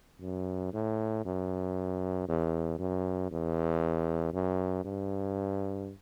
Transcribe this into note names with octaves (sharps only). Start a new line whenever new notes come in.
F#2
A2
F#2
E2
F#2
E2
F#2
G2